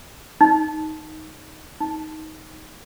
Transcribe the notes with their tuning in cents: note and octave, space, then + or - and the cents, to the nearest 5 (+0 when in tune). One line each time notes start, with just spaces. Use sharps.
D#4 +5
D#4 +10